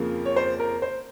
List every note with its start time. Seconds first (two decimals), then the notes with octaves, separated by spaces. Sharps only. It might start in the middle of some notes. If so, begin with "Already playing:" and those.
Already playing: F2 C#3 F3 A#3
0.25 C#5
0.36 C5
0.60 A#4
0.82 C5